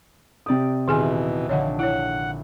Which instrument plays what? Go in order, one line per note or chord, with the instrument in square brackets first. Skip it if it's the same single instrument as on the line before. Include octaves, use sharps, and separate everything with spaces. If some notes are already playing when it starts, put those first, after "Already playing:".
[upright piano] C3 D#6 [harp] G4 D5
[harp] D#1 [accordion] B2 E3 [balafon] D#3 G#4 G#5
[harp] A#1 D3 [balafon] C#5 D#5 F#5
[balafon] E4 C#5 [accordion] F#5